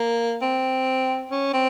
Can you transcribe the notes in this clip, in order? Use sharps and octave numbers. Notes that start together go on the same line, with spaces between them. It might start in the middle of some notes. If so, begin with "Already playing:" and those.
Already playing: A#3
C4
C#4
C4